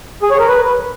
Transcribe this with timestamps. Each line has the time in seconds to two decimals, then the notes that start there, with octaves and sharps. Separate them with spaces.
0.23 G#4
0.31 C#5
0.39 A#4
0.48 B4